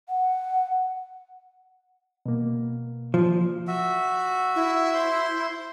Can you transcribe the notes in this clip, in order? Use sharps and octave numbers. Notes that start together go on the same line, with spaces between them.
F#5
B2 A#3
F3
F#4 E5
E4
C5 C6